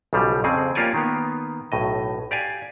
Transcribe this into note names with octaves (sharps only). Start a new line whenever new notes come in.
B1 C#3 F3 G3
F2 C#3 C4 G#4
A#3 F4 G4 C#5 D5 G#5
D#3 A#3 B3
B1 A2 D#5
G4 D5 F5 G#5